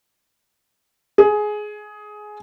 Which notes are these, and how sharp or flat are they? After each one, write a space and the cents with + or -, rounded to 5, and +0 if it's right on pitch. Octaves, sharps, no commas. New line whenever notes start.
G#4 +15